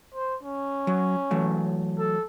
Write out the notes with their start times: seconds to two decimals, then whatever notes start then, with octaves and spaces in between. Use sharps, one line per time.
0.14 C5
0.43 C#4
0.87 F#3
1.31 E3 F#3 A3
1.98 A4